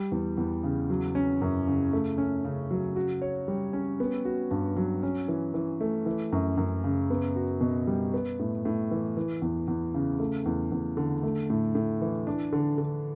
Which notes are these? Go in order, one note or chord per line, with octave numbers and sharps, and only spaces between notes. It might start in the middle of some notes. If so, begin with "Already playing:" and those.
Already playing: G3
E2
E2
C#3
F#3
C#4
F#2
C#3
A3
C#4
C#3
F#3
F#4
C#5
G3
C#4
B3
F#4
G2
F#3
C#4
E3
E3
A3
E3
F#2
F#2
C#3
B3
F#4
B2
G3
B3
A2
A2
E3
E3
E2
E2
C#3
A3
E2
E2
D3
A3
A2
A2
E3
D4
D3
D3